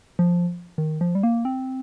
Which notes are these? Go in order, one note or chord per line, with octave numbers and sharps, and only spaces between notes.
F3
D#3
F3
G3
A#3
C4